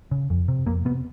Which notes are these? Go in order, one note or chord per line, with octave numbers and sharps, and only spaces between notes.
C#3
F2
C3
F2 A#3
C3 B3